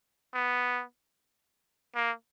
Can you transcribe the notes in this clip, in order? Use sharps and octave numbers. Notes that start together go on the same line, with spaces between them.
B3
A#3